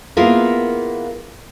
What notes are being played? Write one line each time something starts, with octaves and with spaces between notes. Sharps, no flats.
A#3 B3 E4 F4 G#4 A#4